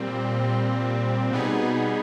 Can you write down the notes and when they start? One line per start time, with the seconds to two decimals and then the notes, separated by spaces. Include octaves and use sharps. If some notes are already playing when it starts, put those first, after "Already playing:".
Already playing: A#2 G3 C4
1.31 B2 G3 B3 D#4 G#4